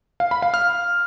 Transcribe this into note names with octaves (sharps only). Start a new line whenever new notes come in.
F5
B5
F5
F6